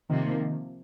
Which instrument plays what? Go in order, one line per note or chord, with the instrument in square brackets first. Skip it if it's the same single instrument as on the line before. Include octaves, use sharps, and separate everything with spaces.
[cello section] C3 F3 A#3 [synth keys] D#3